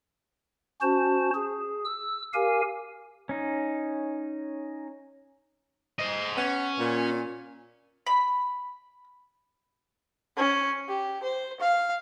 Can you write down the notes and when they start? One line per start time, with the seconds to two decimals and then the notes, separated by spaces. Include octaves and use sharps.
0.82 C#4 F#4 C5 A5
1.34 G#4
1.85 E6
2.34 G4 A#4 F5 G#5
3.29 C#4 D#4
6.00 C5 D#5
6.37 B3 C#4
6.79 A#2
8.07 B5
10.37 C#4
10.88 G4
11.23 C5
11.60 F5